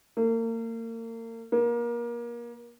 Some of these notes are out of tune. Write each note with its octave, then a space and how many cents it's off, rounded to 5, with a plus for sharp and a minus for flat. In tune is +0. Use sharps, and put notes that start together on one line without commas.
A#3 -35
A#3 +30